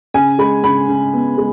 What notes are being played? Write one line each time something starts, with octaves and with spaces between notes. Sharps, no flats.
C#3 G#5
G#3 B5
C#3 B5
C#3
B3
G#3